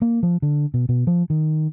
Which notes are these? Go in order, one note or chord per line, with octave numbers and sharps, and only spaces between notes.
A#3
F3
D3
B2
B2
F3
D#3